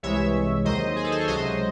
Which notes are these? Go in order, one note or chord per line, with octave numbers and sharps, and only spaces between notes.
C2 C3 E3 G#3 C#5 E5
D#2 D#3 F#3 C5 D#5
G#4
A4
C5
C#5
C#2 C3 F#3 C5 D#5